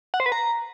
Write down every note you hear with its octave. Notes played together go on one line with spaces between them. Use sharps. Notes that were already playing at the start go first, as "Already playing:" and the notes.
F#5
C5
B4
A#5